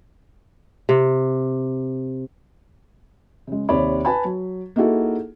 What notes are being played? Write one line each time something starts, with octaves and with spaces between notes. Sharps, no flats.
C3
C#3 G#3
D#2 C3 C4 C#5 D5 B5
B4 G#5 A5 B5
F#3
A#3 D#4 E4 F#4 G#4 A4